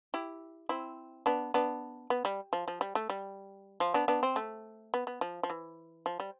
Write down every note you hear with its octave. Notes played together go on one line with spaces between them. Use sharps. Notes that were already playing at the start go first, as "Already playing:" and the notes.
E4 G4
C4 E4
B3 D4
B3 D4
B3
G3
F3
F3
G3
A3
G3
F3
B3 D4
B3 D4
C4
A3
B3
B3
F3
F3
E3
F3
G3